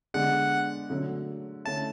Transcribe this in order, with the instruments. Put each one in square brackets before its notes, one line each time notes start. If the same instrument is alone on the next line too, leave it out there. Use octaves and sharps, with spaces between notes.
[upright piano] D3 G#3 B3 D4 [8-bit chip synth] F#5
[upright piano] D3 F#3 A3
[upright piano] D3 A3 C#4 E4 [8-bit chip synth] A5